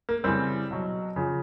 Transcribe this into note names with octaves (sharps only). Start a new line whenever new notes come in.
A#3
C#3 E3 G3 C4
B2 F#3
C#3 F3